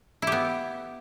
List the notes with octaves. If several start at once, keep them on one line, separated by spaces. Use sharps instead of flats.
B3 E4 G4